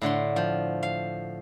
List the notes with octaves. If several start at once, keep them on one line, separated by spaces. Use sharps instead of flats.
A2 D3 F#5 C6
F3
F5